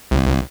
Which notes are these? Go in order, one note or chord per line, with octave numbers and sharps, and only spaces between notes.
C2